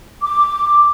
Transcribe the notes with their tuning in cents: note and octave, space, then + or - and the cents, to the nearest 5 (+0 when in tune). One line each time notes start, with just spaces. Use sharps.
D6 +0